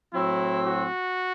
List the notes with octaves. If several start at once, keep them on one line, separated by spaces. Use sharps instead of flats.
A2 F#3 C4 E4
F#4